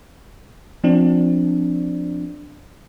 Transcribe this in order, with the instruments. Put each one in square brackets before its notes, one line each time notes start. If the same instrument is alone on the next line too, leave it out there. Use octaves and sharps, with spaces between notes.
[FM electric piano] F3 C4 D4